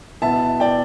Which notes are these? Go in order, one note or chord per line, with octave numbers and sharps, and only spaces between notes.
B2 B3 E4 E5 A5
D5 G5